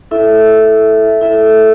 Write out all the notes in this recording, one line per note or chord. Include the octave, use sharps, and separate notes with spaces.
E4 A4 E5
E4 A4 E5